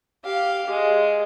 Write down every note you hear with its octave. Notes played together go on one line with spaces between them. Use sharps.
G4 F5
G#3